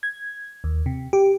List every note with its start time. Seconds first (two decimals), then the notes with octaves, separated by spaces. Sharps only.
0.03 G#6
0.64 D#2
0.86 C3
1.13 G4